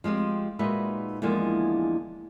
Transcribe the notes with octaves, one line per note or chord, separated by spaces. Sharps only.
F3 G#3 C4 G4
A#2 G#3 D#4 F#4 B4 E5
E2 D3 F3 G#3 A#3